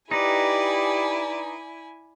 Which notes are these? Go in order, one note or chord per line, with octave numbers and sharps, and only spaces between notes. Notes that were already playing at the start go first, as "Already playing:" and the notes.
D#4 E4 G4 B4 D5 G#5